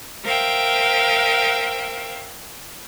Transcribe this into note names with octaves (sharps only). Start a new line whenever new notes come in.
A#4 C5 E5 F5 G5